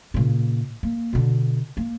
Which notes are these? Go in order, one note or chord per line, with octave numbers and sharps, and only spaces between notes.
A#2 C#3
A#3
B2 D3
A#3